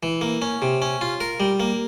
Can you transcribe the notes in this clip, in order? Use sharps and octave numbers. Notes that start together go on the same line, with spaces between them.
E3
A#3
C#4
C3
C#4
F4
A#4
G3
A#3